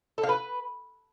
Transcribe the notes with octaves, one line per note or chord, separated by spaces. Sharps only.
A4
F5
B4